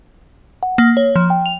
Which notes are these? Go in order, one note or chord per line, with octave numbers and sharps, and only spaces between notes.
F#5
A#3
C#5
F3
G5
F7